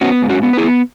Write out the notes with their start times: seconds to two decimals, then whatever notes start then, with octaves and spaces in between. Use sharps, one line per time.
0.01 B3 C#4 F#4
0.22 G#2
0.29 C#4 F#4
0.43 B3
0.53 B4
0.57 E4 G#4
0.64 B3